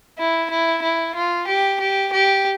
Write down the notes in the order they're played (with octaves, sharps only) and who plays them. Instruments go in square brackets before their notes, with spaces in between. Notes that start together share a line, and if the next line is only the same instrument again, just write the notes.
[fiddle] E4
E4
E4
F4
G4
G4
G4